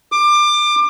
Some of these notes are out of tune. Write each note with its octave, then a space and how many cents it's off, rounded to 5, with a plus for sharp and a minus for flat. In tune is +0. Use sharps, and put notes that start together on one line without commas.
D6 +25